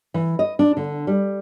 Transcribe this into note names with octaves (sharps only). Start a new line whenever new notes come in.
E3
D#5
D4
D3
G3